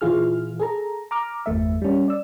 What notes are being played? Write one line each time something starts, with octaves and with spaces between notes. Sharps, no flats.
A#2 E3 E4 F4 G#4 F6
G#4 A4 A#5
A#5 D6 F6
G1 E2 A3 E5
G3 C#4
D5 E6